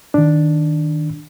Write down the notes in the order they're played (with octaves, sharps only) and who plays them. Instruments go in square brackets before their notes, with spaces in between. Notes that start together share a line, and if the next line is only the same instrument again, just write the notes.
[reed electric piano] D#3 D4